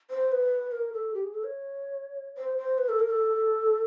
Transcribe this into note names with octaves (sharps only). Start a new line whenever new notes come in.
C5
B4
A#4
A4
G4
G#4
A4
C#5
C5
C5
B4
A4
A#4
A4